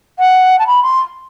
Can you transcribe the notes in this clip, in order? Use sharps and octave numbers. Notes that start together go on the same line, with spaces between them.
F#5
A5
B5
C6